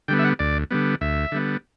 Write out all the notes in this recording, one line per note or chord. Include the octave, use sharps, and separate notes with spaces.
D3 G3 B3 G5
E5
F#5
D2 D5
D3 G3 B3
D2 E5
D3 G3 B3